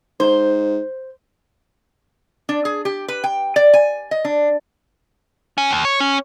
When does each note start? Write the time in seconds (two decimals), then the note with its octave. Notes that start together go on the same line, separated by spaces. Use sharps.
0.20 G#2 C5
2.49 D4
2.65 G#4
2.85 G4
3.08 B4
3.24 G5
3.56 D5
3.74 G#5
4.11 D#5
4.25 D4
5.58 C#4
5.71 D#2
5.85 C#5
6.00 C#4